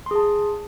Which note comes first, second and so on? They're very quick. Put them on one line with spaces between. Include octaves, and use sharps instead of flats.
C6 G#4 A5